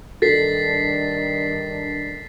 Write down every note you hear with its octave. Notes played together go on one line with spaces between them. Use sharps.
G2 D#3 D4 A4 A6 B6 C7